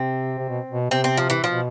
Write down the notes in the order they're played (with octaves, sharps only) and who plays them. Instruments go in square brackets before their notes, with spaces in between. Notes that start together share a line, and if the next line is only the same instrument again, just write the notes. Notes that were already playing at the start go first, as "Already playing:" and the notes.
Already playing: [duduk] C3 [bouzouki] C4
[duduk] C3
B2
B2
[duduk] C3 [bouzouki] C4
[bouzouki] C4
F3
E3
[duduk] B2 [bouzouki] F3